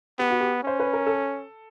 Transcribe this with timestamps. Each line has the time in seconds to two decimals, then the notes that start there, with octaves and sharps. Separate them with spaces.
0.19 B3 G4
0.30 F#4
0.41 G4
0.63 C#4 C5
0.80 B4
0.93 A#4
1.07 A4